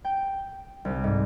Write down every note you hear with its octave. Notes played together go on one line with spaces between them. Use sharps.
G5
C2
G#2